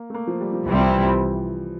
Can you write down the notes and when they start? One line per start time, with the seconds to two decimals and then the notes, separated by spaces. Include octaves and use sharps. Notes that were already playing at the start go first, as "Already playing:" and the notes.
Already playing: A#3
0.10 A3
0.14 A#3
0.27 F3
0.41 G3
0.53 F3
0.66 C2 C3 E3 G3 C4 E4
0.79 F3
0.92 E3
1.05 F3